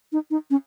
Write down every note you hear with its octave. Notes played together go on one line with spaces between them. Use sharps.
D#4
D#4
C#4